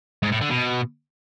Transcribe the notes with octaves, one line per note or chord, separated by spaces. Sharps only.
G#2
A2
D3
B2